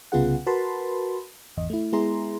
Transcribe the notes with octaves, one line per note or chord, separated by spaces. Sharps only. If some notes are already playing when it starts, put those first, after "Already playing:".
C2 C#3 B3 F4 G#4 F#5
F#4 A#4 B4 A5 B5 C6
G#1 E2 D#5
A3 E4
G#3 B3 E4 G#4 A#5 C6